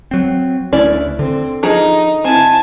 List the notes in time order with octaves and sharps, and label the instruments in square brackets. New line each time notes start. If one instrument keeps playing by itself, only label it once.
[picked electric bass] F#3 C4
[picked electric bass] D2 [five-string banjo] C#4 E4 D5
[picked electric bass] D3 [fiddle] C4
[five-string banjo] F3 G#4 A#5 [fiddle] D#4
[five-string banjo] C4 E4 [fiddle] G#5 A5